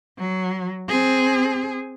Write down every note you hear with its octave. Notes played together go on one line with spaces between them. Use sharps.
F#3
C4 G#4